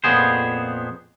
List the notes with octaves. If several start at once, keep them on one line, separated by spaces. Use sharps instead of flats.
F2 A#2 B3 G#4 C5